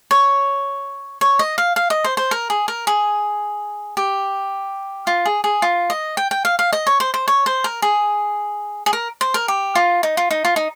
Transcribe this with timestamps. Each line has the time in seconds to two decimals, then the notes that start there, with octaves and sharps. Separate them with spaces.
0.11 C#5
1.21 C#5
1.39 D#5
1.58 F5
1.76 F5
1.90 D#5
2.04 C5
2.17 C5
2.31 A#4
2.50 G#4
2.68 A#4
2.87 G#4
3.97 G4
5.07 F4
5.26 G#4
5.44 G#4
5.62 F4
5.90 D#5
6.17 G5
6.31 G5
6.45 F5
6.59 F5
6.73 D#5
6.87 C#5
7.00 C5
7.14 C5
7.28 C#5
7.46 C5
7.64 A#4
7.82 G#4
8.86 G#4
8.93 A#4
9.21 C5
9.34 A#4
9.48 G4
9.75 F4
10.03 D#4
10.17 F4
10.31 D#4
10.45 F4
10.56 D#4